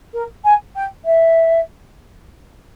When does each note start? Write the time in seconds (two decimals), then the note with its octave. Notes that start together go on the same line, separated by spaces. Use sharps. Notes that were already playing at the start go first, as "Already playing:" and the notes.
0.13 A#4
0.44 G#5
0.75 G5
1.05 E5